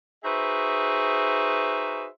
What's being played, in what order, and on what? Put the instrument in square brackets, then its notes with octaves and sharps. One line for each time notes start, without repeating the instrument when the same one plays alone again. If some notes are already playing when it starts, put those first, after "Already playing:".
[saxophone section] D#4 F#4 G#4 B4 C5 E5